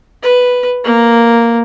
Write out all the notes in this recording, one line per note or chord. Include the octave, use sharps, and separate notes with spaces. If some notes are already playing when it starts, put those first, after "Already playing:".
B4
A#3